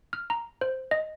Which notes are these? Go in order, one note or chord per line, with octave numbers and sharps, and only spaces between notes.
F6
A#5
C5
D#5